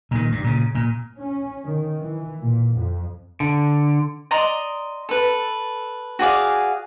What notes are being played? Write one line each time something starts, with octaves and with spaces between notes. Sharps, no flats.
A#2 D#3
G2
A#2 C#3
A#2
C#4
D#3
E3
A#2
F2
D3
D5 D#5 A#5 C6
A4 B4
F#4 G#4 D5 F5